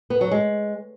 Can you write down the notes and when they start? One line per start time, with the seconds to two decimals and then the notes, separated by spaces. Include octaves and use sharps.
0.10 B3
0.21 F#3
0.31 G#3